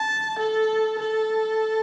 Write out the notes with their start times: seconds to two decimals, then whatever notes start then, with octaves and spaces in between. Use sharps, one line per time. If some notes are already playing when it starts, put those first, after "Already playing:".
Already playing: A5
0.39 A4
0.99 A4